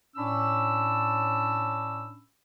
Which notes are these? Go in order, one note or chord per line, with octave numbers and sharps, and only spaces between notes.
A2 C#4 D4 A5 B5 E6